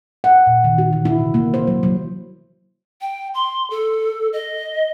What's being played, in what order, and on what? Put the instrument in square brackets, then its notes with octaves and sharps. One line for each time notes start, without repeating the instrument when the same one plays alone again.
[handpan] F#5
A#2
D#3
F#4
E3
E4
C3
A#3
C5
F#3
F#3
[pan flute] G5
C6
A4
D#5